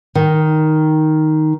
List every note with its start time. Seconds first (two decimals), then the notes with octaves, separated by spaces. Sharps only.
0.15 D#3